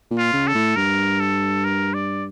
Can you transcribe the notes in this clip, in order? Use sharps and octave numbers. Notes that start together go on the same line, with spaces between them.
A#2
F4
C#3
A4
A2
G2 A#4
A4
A#4
D5